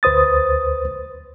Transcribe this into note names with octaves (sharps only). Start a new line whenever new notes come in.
D2 B4 C5 D#6 A6